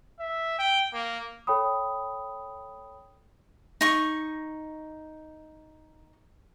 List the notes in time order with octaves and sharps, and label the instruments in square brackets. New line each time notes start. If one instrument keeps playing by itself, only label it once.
[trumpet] E5
G5
A#3
[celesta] A4 C#5 G5 B5 D#6
[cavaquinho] D#4 C#6